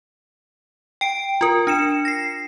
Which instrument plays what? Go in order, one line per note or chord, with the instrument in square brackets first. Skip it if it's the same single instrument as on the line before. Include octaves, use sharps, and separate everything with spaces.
[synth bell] G5 D7
F4 A#4
D4 C#7 E7
A#6 C7